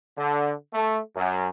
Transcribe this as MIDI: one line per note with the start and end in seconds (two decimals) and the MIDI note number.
0.17 0.52 50
0.73 0.99 57
1.16 1.47 42